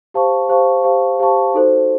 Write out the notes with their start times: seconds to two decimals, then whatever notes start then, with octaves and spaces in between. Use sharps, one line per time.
0.14 G4 C5 F5 A5 C#6
0.49 G4 C5 F5 A5 C#6
0.83 G4 C5 F5 A5 C#6
1.20 G4 C5 F5 A5 C#6
1.54 D#4 F#4 A4 C5